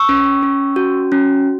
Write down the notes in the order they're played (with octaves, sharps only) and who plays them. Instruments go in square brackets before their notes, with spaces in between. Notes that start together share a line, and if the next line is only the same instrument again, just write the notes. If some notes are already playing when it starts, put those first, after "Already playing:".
Already playing: [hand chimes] C#6 E6
C#4
C#4
F#4
C#4